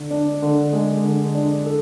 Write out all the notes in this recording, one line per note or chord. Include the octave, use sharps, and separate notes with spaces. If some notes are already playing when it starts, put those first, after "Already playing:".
Already playing: D3
D4
D3
G#3
D3
D4
A4